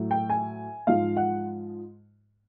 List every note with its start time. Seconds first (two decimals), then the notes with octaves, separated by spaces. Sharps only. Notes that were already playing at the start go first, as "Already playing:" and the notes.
Already playing: A2 F#3
0.11 G5
0.30 G#5
0.87 G#2 F3 G#3 F5
1.17 F#5